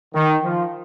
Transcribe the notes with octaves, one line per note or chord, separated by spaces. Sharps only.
D#3
F3